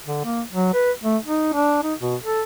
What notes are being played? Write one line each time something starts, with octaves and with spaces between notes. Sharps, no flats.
D3
A#3
F#3
B4
A3
D#4
D4
D#4
B2
A4